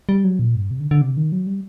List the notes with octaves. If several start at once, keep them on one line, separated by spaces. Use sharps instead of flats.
G3
F#3
A#2
G2
C3
D3
D3
C3
D#3
F#3
G3